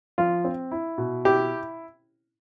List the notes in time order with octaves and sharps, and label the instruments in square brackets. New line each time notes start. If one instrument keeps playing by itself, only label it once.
[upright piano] F3 [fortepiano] F4
[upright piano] C4
E4
B2
[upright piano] E4 [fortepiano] G4